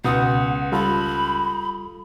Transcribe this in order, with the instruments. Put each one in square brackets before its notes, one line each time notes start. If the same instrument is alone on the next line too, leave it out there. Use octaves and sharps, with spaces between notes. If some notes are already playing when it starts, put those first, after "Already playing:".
[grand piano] C#2 D#6 [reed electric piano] B2 B3 [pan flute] F#5
[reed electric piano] G3 F4 A4 [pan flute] B5